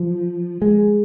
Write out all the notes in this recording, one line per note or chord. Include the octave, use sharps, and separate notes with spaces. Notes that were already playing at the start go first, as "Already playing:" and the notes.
Already playing: F3
G#3